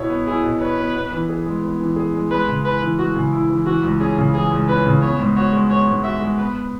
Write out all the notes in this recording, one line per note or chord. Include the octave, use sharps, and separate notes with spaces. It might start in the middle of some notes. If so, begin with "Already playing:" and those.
Already playing: B2 E4 C#5
B3
E4 G#4
B2
B4 C#5
B3
B3
E3
G#4
G#3
B3
E3
G#4
G#3
G#3 B4
C#3
E4 B4
E3
G#3 F#4
C#3
E4
E3
E3 F#4
C#2
C#4 G#4
C#3
E3 G#4
C#2
C#4 B4
C#3
B3 C#5
G#2
F#4 C#5
G#3
B3 C#5
G#2
F#4 E5
G#3
B3 B4